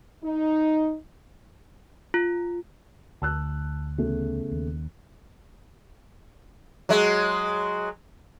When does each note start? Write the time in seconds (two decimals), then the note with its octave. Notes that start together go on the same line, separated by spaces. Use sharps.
0.24 D#4
2.14 F4
3.22 D2 A5 E6 F#6
3.98 E2 C#3 A3
4.51 D#2
6.89 F#3 G#3